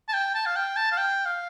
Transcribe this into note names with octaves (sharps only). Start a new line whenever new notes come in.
A5
G5
A5
F5
G5
A5
F5
G5
F5